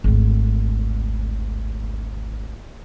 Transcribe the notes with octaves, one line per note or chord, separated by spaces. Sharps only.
G#1 D2